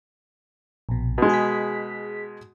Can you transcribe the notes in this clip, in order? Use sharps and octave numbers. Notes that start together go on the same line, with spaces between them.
A#1 B2
B2 G#3
G#4 B6